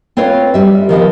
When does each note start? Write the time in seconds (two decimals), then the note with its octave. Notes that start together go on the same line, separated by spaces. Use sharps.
0.17 C4 F4 B4 C#5 F5
0.54 G3 E5
0.89 D#3 F3 B3 C4